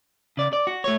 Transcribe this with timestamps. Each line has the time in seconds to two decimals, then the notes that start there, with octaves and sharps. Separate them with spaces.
0.37 C#3 D5
0.53 D5
0.67 F#4
0.84 A3 C#5